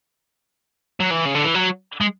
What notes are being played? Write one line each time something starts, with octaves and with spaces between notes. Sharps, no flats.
F#3
E3
C#3
D3
E3
F#3
G#3